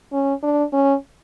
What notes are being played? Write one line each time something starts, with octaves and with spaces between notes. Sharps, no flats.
C#4
D4
C#4